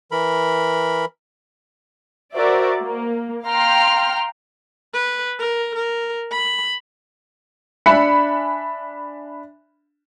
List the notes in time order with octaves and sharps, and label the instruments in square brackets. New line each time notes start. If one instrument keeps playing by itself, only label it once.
[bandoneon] E3 A#4 B5
[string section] F#4 A#4 C5 D5 E5
A#3
F5 G5 A#5 C6 F6
[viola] B4
A#4
A#4
B5
[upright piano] D4 E5 G#5 B5 F#6 C#7